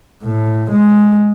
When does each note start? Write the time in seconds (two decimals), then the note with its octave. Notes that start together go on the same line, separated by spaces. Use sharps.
0.24 A2
0.71 G#3